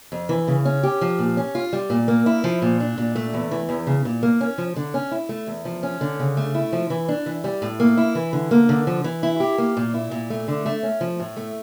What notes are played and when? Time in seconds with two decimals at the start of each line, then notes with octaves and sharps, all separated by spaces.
0.12 F2
0.29 E3
0.48 C#3
0.65 C#4
0.83 G4
1.01 F3
1.19 A#2
1.37 C#4
1.55 F4
1.73 G3
1.90 A#2
2.08 A#3
2.26 E4
2.44 F3
2.62 A#2
2.80 D4
2.98 A#2
3.15 A3
3.34 E2
3.51 E3
3.69 E2
3.87 C#3
4.05 A#2
4.23 A#3
4.41 C#4
4.58 F3
4.76 D3
4.94 C#4
5.11 E4
5.29 A3
5.47 E2
5.65 F3
5.83 C#4
6.01 D3
6.20 C#3
6.37 A3
6.55 E4
6.73 F3
6.90 E3
7.09 D4
7.26 E3
7.44 G3
7.62 A2
7.80 A#3
7.97 E4
8.15 E3
8.33 D3
8.51 A#3
8.69 D3
8.87 F3
9.04 E3
9.23 E4
9.40 G4
9.58 A#3
9.77 A#2
9.94 E4
10.11 A#2
10.30 A3
10.48 D3
10.66 A3
10.83 C#4
11.01 F3
11.20 A2
11.37 A3